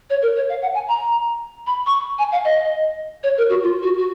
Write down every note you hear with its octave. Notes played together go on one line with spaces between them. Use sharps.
C#5
A#4
C#5
F5
F#5
G#5
A#5
B5
C#6
G#5
F5
D#5
C#5
A#4
F#4
F4
F#4
F#4